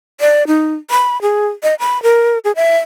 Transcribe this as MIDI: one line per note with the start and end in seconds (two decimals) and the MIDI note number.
0.21 0.44 74
0.47 0.74 63
0.91 1.21 83
1.22 1.47 68
1.63 1.75 75
1.80 2.01 83
2.03 2.38 70
2.44 2.52 68
2.56 2.78 76